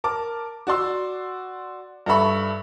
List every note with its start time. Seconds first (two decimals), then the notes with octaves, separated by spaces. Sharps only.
0.04 A#4 A5 D6
0.67 F#4 D5 C6 E6
2.06 G2 A4 E5 B5 C#6